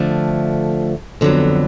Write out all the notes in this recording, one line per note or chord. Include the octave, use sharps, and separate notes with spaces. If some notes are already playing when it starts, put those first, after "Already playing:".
Already playing: D3 F3 A3
F2 D3 F#3 B3